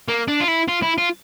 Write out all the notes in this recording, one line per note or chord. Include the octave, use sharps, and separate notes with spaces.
A#3
D4
F4
E4
F4
E4
F4